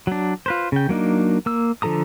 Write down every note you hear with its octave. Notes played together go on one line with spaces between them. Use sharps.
F#3 D4
F4 B4 C5
C#3 G5
F#3 A#3 D4 D#4
A#3 E6
D3 F3 A4 A#5 D#6